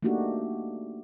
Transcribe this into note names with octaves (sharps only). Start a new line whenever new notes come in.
A3 A#3 D4 D#4 F#4 G4